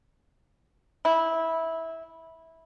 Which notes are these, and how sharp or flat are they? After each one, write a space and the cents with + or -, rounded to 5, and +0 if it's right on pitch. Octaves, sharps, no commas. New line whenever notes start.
E4 -15